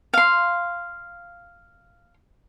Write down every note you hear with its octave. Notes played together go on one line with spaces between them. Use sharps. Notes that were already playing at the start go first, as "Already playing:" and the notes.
F5 C6